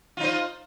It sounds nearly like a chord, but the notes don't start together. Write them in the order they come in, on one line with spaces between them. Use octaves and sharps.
F4 D#4 C5